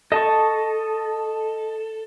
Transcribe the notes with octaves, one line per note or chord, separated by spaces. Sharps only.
A4 D#5 A5 C#6